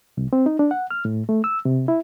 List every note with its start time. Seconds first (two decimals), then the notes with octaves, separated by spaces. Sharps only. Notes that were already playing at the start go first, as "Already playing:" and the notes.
0.17 C2
0.33 C4
0.46 D#4
0.59 D4
0.71 F#5
0.91 F6
1.05 A2
1.29 A3
1.44 E6
1.65 C3
1.88 E4